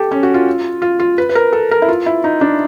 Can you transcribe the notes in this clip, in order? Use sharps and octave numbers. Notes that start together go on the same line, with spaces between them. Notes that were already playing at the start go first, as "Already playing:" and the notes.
Already playing: G4 A4
C#4
F#4
F4
F4
F4
B4
B4
A#4
A4
A#4
E4
F4
E4
D#4
D4